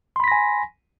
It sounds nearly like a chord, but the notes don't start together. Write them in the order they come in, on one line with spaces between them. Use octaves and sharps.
C6 B5 B6 A#6 G#5